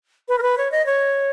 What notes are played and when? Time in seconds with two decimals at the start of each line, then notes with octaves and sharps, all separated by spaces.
0.28 B4
0.38 A#4
0.42 B4
0.58 C#5
0.72 D#5
0.86 C#5